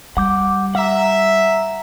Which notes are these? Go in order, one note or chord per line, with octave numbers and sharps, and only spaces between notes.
G3 F#5 D6 G6
E5 F#5 A#5